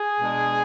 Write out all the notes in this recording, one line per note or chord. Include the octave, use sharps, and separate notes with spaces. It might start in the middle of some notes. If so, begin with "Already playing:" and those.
Already playing: G#4
B2 G#3 D4